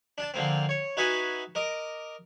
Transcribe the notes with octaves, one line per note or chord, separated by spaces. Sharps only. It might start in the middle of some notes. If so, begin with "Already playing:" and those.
D4 A5
D3 F3 A#3 C4
C#5
D#4 F#4 B4 E5 G#5
A#4 D#5 D6